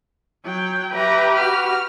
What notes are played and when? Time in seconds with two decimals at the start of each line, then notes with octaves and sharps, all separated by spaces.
0.45 F#3 G5
0.94 G4 B4 E5 A#5
1.37 F#4 F6